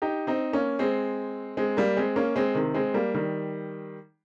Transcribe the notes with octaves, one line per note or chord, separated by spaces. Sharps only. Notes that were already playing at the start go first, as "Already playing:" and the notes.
D#4 G4
C4 D#4
A#3 C#4
G#3 C4
G#3 C4
G3 A#3
G#3 C4
A#3 C#4
G#3 C4
C3 D#3
G#3 C4
G3 A#3
D#3 G3